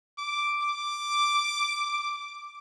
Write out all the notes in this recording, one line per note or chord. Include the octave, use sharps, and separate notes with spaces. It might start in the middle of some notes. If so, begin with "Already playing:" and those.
D6
D6